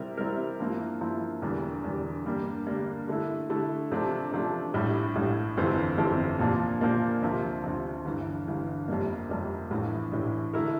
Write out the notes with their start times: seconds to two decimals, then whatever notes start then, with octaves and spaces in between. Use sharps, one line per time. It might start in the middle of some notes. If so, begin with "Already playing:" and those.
Already playing: C3 G3 C4 E4 A#4
0.17 C3 G3 C4 E4 A#4
0.59 G2 F3 A#3 E4
1.01 G2 F3 A#3 E4
1.42 E1 E2 D3 G3
1.83 E1 E2 D3 G3
2.25 G2 D3 G3 A#3
2.67 G2 D3 G3 A#3
3.08 D3 A3 E4
3.49 D3 A3 E4
3.92 C3 F3 A3 D4
4.32 C3 F3 A3 D4
4.74 A#1 A2 G3
5.15 A#1 A2 G3
5.57 G1 F2 E3 A3 C4
5.98 G1 F2 E3 A3 C4
6.39 A#2 F3 A#3 D4
6.81 A#2 F3 A#3 D4
7.23 D2 C3 F3
7.64 D2 C3 F3
8.05 G1 G2 E3
8.47 G1 G2 E3
8.88 F2 C3 G3 A#3
9.29 F2 C3 G3 A#3
9.71 A#1 A2 E3
10.12 A#1 A2 E3
10.53 D3 A3 E4 A#4